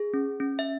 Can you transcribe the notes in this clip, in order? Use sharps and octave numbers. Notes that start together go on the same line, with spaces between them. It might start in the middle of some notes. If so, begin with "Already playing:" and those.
Already playing: G#4
C#4
C#4
E5